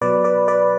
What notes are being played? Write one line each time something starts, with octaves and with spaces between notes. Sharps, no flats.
B2 F#3 B4 D5
B4 D5
B4 D5